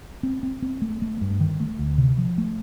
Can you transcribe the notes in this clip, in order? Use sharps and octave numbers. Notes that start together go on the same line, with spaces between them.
C4
C4
C4
A3
A3
G2
D#3
A3
D2
C3
F3
A3